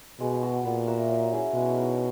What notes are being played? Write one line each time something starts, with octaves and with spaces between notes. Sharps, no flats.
B2 G#3
B3 F#4
A#2 B3
F#4 A#4 E5
F#3
C#4 E4 G#4
B2 G#3
B3 D#4 A#4